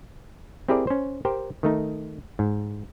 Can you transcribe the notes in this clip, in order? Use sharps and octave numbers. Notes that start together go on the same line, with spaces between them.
C4 E4 G4 G#4 A#4 D5
C#4 C5
G4 A#4 C5 G5
D#3 A3 D#4
G#2